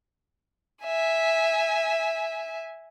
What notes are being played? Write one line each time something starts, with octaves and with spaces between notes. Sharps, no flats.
E5 G#5